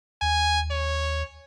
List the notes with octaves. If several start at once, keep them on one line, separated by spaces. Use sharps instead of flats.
D#2 G#5
C#5